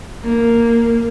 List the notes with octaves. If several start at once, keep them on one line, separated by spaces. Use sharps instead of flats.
A#3